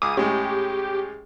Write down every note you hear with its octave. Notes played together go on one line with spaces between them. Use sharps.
C#2 G#4 D6 D#6
A2 G#3 C#4 G4